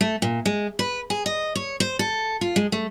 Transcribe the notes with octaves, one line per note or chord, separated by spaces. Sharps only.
A3
A#2
G#3
B4
G#4
D#5
C#5
C5
A4
F4
G#3
A3